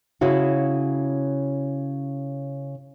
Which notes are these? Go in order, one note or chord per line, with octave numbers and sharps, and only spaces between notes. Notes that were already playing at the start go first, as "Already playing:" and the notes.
C#3 E4 F#4